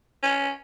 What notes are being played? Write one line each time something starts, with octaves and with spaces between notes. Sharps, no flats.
C#4